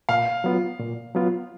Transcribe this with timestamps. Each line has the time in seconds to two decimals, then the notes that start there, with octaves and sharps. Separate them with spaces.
0.09 A#2 F5
0.44 F#3 B3 F4
0.80 A#2
1.15 F#3 B3 F4